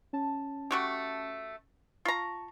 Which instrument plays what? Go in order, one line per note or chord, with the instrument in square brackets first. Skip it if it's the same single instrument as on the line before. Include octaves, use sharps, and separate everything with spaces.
[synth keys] C#4 A5
[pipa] A3 F#4 G4
[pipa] F4 A#5 [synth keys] A5 C#6